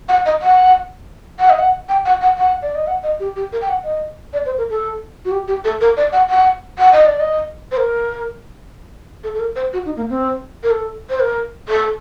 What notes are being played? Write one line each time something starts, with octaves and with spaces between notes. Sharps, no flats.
F#5
D#5
F#5
F#5
D#5
F#5
G5
F#5
F#5
F#5
D5
D#5
F#5
D#5
G4
G4
A#4
G5
F#5
D#5
D5
C5
A#4
A4
F#4
G4
G4
A4
A#4
D5
F#5
F#5
F#5
D#5
D5
D#5
C5
A#4
A4
A4
A#4
C5
F#4
D#4
A#3
C4
A#4
A4
C5
A#4
A4